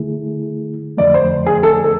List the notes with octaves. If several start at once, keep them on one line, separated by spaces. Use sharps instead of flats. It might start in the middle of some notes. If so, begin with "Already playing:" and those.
Already playing: D3 A3 E4 G#4
F2 D3 F3 A3 D5
C5
G#4
A4
A4